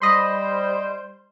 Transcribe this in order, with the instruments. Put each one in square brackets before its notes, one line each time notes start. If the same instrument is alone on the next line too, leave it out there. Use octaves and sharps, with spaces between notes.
[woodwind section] G3 C5 [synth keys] D#5 B5 C6